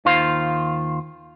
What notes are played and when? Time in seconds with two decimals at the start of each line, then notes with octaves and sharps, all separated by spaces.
0.05 D#2 D#3 F4 C5 F5